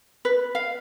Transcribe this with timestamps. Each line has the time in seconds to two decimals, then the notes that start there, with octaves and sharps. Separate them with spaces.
0.25 B4
0.55 F5